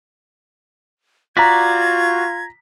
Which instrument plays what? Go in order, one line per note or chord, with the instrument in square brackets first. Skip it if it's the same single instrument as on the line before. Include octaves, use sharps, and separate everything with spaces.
[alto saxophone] F4 [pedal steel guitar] F#4 D5 [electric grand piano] A#5 B6 [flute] G#6